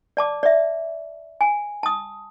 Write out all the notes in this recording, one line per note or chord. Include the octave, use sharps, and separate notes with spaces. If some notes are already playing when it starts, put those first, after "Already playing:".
D5 A5 D6
D5 E5
G#5
A5 D#6